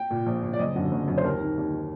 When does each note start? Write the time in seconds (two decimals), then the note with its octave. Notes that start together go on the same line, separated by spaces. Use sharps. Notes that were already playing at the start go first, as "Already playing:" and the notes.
Already playing: G5
0.11 A#2
0.26 A#1
0.43 A#2
0.53 D5
0.59 F#1 D#5
0.76 F#2 D3
0.91 F#1
1.08 F#2 D3
1.18 C5
1.24 D#2 A#4
1.41 D#3
1.57 D#2
1.73 D#3